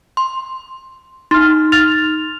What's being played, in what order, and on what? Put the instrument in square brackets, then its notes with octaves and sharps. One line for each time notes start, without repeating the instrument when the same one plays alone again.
[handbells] C6
[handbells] D#4 [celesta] C6 F6
[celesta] F6 A6 F7